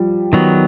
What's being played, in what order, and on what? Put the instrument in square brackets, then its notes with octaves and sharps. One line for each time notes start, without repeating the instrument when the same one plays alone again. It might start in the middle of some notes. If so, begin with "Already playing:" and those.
Already playing: [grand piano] F3 G3
[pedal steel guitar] D#3 F#3 B3